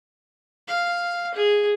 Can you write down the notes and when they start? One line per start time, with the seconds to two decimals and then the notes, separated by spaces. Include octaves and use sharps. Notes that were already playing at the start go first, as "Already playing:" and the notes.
0.68 F5
1.34 G#4